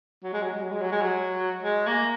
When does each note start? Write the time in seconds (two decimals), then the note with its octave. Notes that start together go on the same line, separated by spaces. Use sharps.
0.23 F#3
0.33 G#3
0.43 F#3
0.53 G#3
0.62 F#3
0.72 G#3
0.82 F#3
0.92 G#3
1.01 F#3
1.63 G#3
1.87 A#3